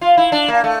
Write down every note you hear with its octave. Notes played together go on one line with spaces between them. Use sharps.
F4
E4
D4
A#3
A3